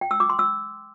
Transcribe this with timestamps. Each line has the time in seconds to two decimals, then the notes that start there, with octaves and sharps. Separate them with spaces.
0.01 G5
0.11 E6
0.20 D6
0.30 C6
0.39 E6